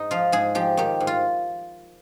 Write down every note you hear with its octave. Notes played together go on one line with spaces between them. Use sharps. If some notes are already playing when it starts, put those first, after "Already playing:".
Already playing: G#2 D#4
F3 F4
G#2 G#4
F3 G4
D#3 G4
G#2
F4